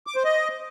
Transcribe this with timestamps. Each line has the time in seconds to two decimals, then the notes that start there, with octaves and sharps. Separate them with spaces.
0.07 D6
0.16 C5
0.25 D#5